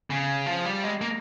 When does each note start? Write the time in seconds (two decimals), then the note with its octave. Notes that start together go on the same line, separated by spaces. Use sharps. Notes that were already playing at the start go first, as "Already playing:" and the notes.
0.10 C#3
0.46 F3
0.65 G3
0.84 G#3
1.01 A#3